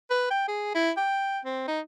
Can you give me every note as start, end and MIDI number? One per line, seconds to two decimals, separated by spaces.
0.10 0.27 71
0.31 0.44 79
0.48 0.71 68
0.75 0.91 64
0.97 1.40 79
1.45 1.66 60
1.68 1.80 63